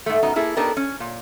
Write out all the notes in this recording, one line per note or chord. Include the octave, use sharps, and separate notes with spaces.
G#2 A3
F#2 B2 D#4
A#3 E4 G#4 A4
B3 D4 D#4 G4 A4 A#4
C#4
A#2